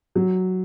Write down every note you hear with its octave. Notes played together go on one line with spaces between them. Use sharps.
F#3